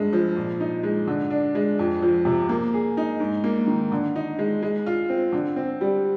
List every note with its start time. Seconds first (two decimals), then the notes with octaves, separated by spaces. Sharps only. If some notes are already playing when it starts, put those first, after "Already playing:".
Already playing: G2 G#3
0.13 F3
0.37 A#2
0.60 D#4
0.83 G#3
1.07 D3
1.30 D4
1.55 G#3
1.79 F2
2.02 F3
2.25 C3
2.49 A#3
2.74 G#4
2.97 D#4
3.20 G#2
3.44 A#3
3.67 D#3
3.92 D3
4.15 D#4
4.39 G#3
4.62 G#3
4.86 F4
5.09 C4
5.33 D3
5.56 C4
5.81 G3